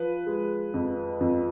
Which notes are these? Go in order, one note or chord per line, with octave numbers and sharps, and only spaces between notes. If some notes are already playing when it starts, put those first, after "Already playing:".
Already playing: F3 B4
G#3
F2
F2